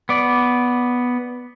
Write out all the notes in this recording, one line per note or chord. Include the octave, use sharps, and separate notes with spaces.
B3 D5